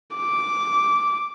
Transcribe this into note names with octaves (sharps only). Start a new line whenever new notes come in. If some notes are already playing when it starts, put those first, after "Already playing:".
D6